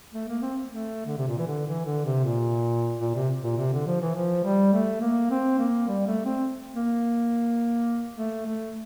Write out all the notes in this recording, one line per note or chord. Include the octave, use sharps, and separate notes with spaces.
A3
A#3
C4
A3
D3
C3
A#2
E3
D3
E3
D3
C3
A#2
A#2
C3
A#2
C3
D3
F3
E3
F3
G3
A3
A#3
C4
A#3
G3
A3
C4
A#3
A3
A3